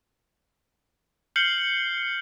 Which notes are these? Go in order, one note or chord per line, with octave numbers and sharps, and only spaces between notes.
F6 G6 C7 C#7 F#7 G7